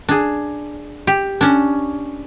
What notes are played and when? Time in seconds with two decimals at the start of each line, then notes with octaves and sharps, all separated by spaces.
0.09 D4 G#4
1.07 G4
1.41 C#4 D4